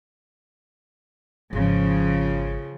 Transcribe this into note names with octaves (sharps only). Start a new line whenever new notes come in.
G#1 C#3 F3